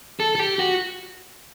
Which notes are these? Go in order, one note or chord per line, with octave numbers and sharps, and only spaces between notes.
A4
A4
G4
F#4